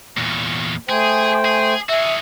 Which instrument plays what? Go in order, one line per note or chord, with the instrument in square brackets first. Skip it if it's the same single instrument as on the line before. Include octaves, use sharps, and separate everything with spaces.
[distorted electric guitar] E2 A#2 [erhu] C#6
[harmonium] A3 C5 G5 [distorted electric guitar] G#4 [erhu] G#5
[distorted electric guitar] G#4
[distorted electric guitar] F#4 G#4 [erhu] E5